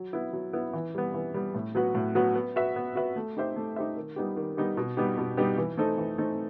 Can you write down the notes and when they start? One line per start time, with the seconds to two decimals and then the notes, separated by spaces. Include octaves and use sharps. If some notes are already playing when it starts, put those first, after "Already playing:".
Already playing: F#3
0.13 B3 E4
0.33 F#3
0.53 B3 E4
0.73 E3
0.95 G3 B3
1.14 E3
1.34 G3 B3
1.54 A2
1.75 F#3 B3 F#4 B4
1.95 A2
2.15 F#3 B3 F#4 B4
2.35 B3
2.56 F#4 B4 E5
2.76 B3
2.95 F#4 B4 E5
3.16 A3
3.37 D#4 G4 C5 E5
3.56 A3
3.76 D#4 G4 C5 E5
3.97 D#3
4.16 G3 B3 D#4 G4
4.37 D#3
4.57 G3 B3 D#4 G4
4.77 B2
4.97 G3 B3 D#4 G4
5.18 B2
5.37 G3 B3 D#4 G4
5.58 E3
5.77 A3 C4 D#4 A4
5.98 E3
6.18 A3 C4 D#4 A4